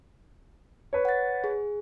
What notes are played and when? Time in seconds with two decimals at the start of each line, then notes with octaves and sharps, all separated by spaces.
0.93 B4 C#5
1.05 F#5 A6
1.44 G#4